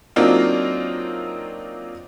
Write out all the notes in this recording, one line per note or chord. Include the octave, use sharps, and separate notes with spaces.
F#3 A#3 C4 D4 D#4 F4